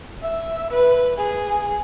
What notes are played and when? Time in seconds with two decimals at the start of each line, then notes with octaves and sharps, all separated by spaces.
0.22 E5
0.73 B4
1.18 G#4